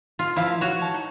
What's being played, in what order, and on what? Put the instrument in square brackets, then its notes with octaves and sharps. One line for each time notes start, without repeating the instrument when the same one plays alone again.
[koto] F4
[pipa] C3 F5 [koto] F3 E4
[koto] F#4 C#5
[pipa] A5
D#4